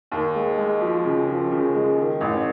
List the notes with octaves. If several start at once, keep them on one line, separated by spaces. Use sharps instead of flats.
D#2
G#3
G#3
F3
C#3
F3
C#3
G#3
D#3
A1